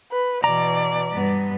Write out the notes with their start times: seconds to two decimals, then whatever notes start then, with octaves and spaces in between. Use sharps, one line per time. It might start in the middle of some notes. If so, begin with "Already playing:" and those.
0.12 B4
0.44 B2 E3 D5 A#5
1.12 G2 B3